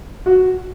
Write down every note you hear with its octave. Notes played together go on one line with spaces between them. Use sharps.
F#4